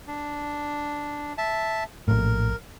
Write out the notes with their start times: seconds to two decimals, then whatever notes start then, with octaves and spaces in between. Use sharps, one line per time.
0.07 D4
1.38 E5 A5
2.08 A#1 A2 A#4